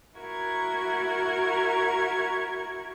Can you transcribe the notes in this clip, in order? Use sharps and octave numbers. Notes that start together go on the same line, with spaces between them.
E4 F#4 A#4 C#6 G#6